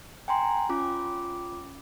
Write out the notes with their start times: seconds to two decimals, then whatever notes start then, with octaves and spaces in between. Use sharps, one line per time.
0.28 G5 G#5 A#5 C6
0.69 C#4 F4 D6